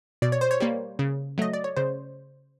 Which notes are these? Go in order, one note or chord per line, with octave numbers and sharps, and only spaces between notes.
B2 D5
C#5
C5
C#5
G3 A#3
C#3
F#3 A3 D#5
D5
C#5
C#3 C5